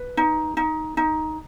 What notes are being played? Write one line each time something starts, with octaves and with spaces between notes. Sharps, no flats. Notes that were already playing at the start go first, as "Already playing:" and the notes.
Already playing: B4
D#4
D#4
D#4